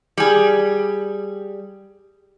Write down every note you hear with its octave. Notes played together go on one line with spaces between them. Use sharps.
G3 G#4